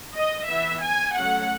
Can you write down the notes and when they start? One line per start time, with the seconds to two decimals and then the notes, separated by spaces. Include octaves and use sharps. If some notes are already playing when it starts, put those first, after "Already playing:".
0.15 D#5
0.49 E3 B3 E5
0.83 G#5
1.16 F#3 A3 C#4 F#5